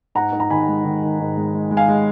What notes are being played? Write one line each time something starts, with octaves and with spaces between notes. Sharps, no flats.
G#2 F#5 A#5
G#2
A#5
D#3 G#5 B5
G#3
D#3
D#3
G#2
G#3
G#3
G#3
F5 G#5
G#3